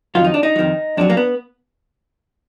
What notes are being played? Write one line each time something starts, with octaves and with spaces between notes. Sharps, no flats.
F2 D#3 F#3 F4
D#4
D4
D#4
F#3
F2 D#3
F2 D#3 F#3 D4
A#3
B3